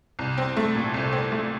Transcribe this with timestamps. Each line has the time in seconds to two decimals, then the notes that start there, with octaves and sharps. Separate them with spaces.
0.19 C2
0.38 C4
0.57 A3
0.75 A#2
0.94 C2
1.12 C4
1.32 A3